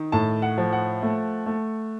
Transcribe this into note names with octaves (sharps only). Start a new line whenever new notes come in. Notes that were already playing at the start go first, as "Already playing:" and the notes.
Already playing: D#3
A2 A5
F#5
F3
F#5
A3
A3